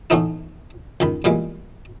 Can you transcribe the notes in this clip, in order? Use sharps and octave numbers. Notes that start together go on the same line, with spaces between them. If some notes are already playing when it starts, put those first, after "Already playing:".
A2 E3 A3 B3 D#4 E4
C#2 D#3 B5
E2 A#2 E3 G3 G#3